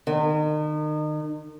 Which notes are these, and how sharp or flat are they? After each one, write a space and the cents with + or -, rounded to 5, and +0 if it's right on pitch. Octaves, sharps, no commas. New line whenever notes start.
D#3 -35